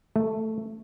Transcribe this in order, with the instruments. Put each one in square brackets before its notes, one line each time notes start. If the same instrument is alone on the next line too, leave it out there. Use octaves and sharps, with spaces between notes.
[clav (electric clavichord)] A3